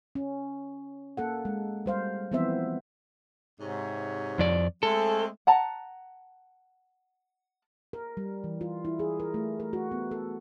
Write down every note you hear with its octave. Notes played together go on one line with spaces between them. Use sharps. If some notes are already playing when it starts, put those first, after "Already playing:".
C#4
A#3 A4 F#5
G#3
G3 C5 F5
E3 F3 B3 C4 C5 E5
G#2 C3 C#5
F2 D5
G#3 A3 C4 A4
F#5 A5 A#5
A#4
G3
E3
F4
E4
G#4
A#4
A3
A#4
F#4
B3
A4